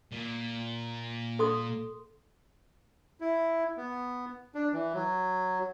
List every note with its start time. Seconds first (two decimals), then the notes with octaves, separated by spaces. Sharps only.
0.12 A#2
1.39 A4 C6 D#6
3.21 E4
3.77 B3
4.55 D4
4.73 E3
4.94 F#3